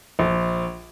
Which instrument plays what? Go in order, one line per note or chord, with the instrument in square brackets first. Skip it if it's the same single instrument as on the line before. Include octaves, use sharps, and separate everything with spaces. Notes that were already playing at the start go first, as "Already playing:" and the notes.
[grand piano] A#1